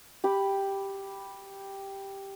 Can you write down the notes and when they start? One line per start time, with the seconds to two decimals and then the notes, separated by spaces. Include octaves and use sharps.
0.24 G4 B5